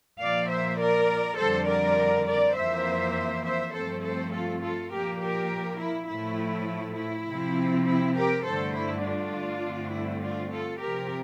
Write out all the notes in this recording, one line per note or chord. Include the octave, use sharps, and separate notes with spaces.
A#2 F3 A#3 D5 F5
C5 E5
A#4 D5
F2 D3 G3 A4 C5
A#4 D5
A#4 D5
F2 E3 A#3 C5 E5
C5 E5
G2 F3 A3 C4 A4 C5
A4 C5
F4 A4
F4 A4
A#2 F3 A#3 G4 A#4
G4 A#4
E4
A2 F3 A3 E4
E4
C3 F3 C4
E4
G4 A#4
G2 D3 A3 A4 C5
E4
D4 F4
G2 D3 A3 C4
E4
D4 F4
F4 A4
C3 F3 C4 G4 A#4